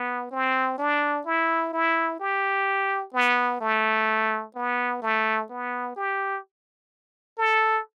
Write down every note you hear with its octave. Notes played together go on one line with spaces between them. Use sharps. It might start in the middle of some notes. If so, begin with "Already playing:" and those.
Already playing: B3
C4
D4
E4
E4
G4
B3
A3
B3
A3
B3
G4
A4